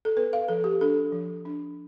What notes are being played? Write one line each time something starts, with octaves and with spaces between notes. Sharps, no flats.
A4
B3 B4
F5
F3 A4
G4
D4 A4
F3
D4